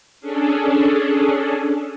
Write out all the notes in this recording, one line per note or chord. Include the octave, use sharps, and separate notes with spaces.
C#4 D4 G#4 A4